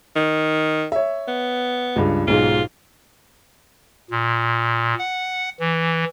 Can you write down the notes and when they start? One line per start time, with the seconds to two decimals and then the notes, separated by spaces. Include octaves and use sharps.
0.16 D#3
0.92 C#5 E5
1.28 B3
1.96 C#2 G2
2.28 B1 G#2 F4
4.11 A#2
4.98 F#5
5.60 E3